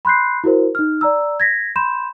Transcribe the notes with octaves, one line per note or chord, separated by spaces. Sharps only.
B5 C6 F#6 G6 C7
E4 F#4 A#4 C5
D#4 F6
D5 A#5 E6
G#6 A#6 B6
B5 C6 G6 E7